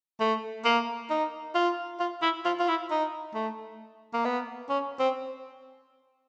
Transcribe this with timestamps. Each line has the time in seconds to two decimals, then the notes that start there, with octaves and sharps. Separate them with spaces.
0.20 A3
0.65 A#3
1.10 D#4
1.55 F4
2.00 F4
2.22 E4
2.45 F4
2.59 F4
2.68 E4
2.91 D#4
3.34 A3
4.13 A#3
4.25 B3
4.69 C#4
4.99 C4